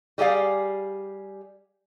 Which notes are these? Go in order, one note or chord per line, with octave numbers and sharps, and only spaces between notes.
G3 G4 G#4 D5 F5